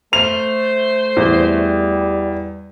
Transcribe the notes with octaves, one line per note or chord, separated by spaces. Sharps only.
A3 C5 F7
E2 G3